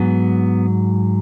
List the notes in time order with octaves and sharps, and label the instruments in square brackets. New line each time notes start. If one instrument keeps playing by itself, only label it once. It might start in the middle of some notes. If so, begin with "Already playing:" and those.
Already playing: [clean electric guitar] G#2 F#3 B3